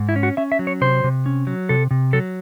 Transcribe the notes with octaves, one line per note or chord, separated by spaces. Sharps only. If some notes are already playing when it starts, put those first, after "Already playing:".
Already playing: G#2
E4
C#4
F#4
C#4 E5
E5
F#3
C#5
C3 C5
C3
C#4
F#3
C3 A4
C3
F#3 A4